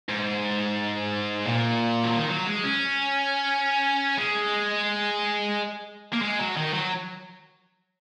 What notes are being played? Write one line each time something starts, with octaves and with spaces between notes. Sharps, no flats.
G#2
A#2
F#3
D#3
F#3
G#3
C#4
G#3
A#3
G#3
F#3
D#3
F#3